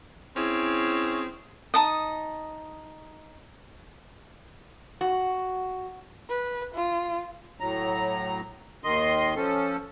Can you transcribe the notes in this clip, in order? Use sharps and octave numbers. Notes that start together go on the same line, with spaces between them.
C4 C#4 E4 G#4
D#4 A5 D#6
F#4
B4
F4
A2 F#3 A#5
D#2 D#3 D#5 C6
F3 C#4 A4